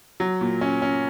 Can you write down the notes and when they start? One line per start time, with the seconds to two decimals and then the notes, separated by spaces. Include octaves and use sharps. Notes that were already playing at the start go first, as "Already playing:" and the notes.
0.20 F#3
0.41 A#2
0.61 C#4
0.82 C#4